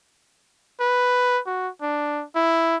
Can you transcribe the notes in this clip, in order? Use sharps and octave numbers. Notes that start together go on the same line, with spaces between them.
B4
F#4
D4
E4